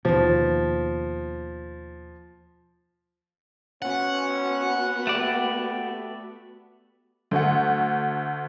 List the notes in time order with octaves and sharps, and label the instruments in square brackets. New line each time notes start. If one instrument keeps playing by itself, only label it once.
[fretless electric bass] D#2 B2 [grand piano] F3
[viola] B3 F#4 [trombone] C#4 [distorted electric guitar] F#5
[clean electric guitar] A3 D5 [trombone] G4
[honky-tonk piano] D2 A3 F#4 F#5